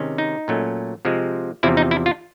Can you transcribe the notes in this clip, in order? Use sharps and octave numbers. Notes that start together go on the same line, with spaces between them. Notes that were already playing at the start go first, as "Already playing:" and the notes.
Already playing: C3 D#3 G#3 C#4
D#4
A#2 F#3 A3 C#4
C3 F3 G#3
E2 C3 F3 E4
D#4
E4
F4